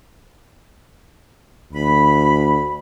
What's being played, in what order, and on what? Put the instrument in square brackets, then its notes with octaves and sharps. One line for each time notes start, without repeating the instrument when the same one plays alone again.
[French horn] D2 [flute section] B5